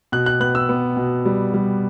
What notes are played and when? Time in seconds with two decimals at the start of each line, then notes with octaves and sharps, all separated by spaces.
0.12 B2 F#6
0.26 F#6
0.40 B3 F#6
0.55 E6
0.69 B3
0.97 B2
1.25 G3
1.54 G3